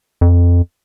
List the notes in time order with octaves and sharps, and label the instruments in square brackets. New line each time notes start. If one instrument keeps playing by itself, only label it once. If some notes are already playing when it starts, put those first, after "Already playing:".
[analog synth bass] F2